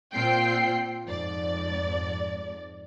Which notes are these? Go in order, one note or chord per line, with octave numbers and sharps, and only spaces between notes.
A#2 C4 F4 G5 C7
F2 G#2 D5